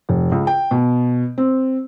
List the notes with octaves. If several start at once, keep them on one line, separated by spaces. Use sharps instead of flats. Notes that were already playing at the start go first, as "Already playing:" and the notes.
F1
C#2
G5
B2
C4